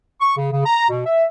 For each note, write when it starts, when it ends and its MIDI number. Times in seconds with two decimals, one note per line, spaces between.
0.20 0.34 85
0.36 0.51 49
0.51 0.61 49
0.65 0.87 82
0.89 1.02 47
1.05 1.25 76